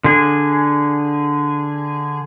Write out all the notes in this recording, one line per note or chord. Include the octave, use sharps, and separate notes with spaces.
D3 G#4